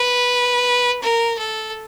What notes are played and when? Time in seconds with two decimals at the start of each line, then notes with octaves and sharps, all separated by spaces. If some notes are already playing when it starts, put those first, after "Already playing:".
Already playing: B4
1.02 A#4
1.38 A4